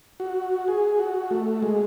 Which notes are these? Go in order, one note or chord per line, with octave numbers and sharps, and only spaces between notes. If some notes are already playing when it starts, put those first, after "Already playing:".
F#4
G#4
F#4
A3
G#3